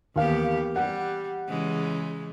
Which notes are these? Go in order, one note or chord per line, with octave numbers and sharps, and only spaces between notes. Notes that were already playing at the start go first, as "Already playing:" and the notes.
D#2 E3 B3 G4 F5
G3 F#5
C#3 E3 G#3